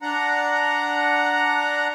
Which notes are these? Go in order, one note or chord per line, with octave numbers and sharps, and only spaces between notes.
D4 F#5 A#5